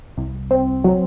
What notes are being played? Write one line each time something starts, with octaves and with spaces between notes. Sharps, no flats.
C2
C4
F#3